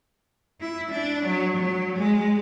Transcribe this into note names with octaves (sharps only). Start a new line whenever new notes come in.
E4
D4
F#3
F#3
G#3